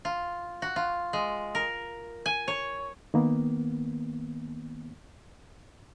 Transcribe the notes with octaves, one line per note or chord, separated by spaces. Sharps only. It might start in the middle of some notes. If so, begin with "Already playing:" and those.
F4
F#4
F4
G#3
A#4
G#5
C#5
D#3 A#3 B3